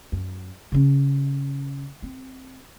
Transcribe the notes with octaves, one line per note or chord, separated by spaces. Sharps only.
F#2
C#3 C#4
C4